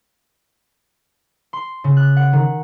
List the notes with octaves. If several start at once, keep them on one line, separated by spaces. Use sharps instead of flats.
C6
C#3
F#6
F#5
D#3